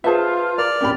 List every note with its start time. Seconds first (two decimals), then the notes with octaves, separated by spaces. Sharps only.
0.04 F4 G#4 B4 C5 E5 A5
0.58 A#4 D5 F6
0.81 A#1 F2 A#3 C#4 G4 B5